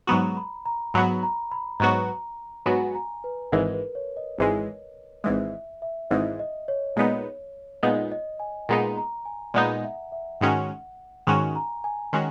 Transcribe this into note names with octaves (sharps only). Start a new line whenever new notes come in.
G#2 F#3 B3 F#4 A#5
B5
A#5
G#2 F#3 B3 F#4 B5
A#5
B5
G#2 F#3 B3 F#4 A#5
G#2 F#3 B3 F#4 G#5
A#5
B4
G#1 G#2 E3 G#3 A#4
B4
C#5
D#5
G#1 G#2 E3 G#3
G#1 G#2 E3 G#3 E5
E5
G#1 G#2 E3 G#3 D#5
D#5
C#5
A#2 G#3 B3 D#4
A#2 G#3 B3 D#4 D#5
D#5
G#5
A#2 G#3 B3 D#4 A#5
A#5
G#5
A#2 G#3 B3 D#4 F#5
E5
E5
G#2 D#3 G#3 C#4 F#4 F#5
G#2 D#3 G#3 C#4 F#4 G#5
A#5
G#5
D#3 G#3 C#4 F#4